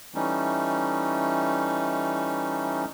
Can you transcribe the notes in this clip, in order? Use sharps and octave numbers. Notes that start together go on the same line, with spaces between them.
E3 G3 A3 C#4 D#4